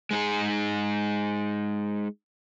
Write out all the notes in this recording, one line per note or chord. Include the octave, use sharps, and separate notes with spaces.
G#3 D#4 G#4